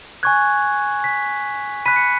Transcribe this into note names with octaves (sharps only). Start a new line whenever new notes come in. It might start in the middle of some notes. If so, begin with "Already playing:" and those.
G#5 C#6 F#6 G#6
B6
B5 F#6 B6 D#7
C#7